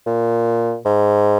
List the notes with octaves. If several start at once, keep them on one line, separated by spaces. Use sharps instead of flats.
A#2
G#2